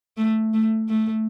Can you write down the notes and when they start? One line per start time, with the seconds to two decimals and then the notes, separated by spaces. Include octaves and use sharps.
0.17 A3
0.54 A3
0.88 A3